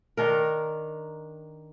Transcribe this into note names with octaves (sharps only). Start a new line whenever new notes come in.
D#3 D4 A#4